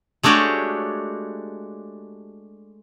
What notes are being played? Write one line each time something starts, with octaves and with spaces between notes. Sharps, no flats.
G#3 A3 D4 F#4 G4 C#5